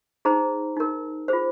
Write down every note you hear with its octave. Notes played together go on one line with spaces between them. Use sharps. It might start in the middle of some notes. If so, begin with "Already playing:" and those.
D#4 G#4 C5 A#5
D#4 A#4
F4 G#4 C5